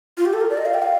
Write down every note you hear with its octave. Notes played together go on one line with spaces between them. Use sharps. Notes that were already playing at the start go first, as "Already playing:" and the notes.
F4
G4
A4
A#4
D5
D#5
F5
G5
F5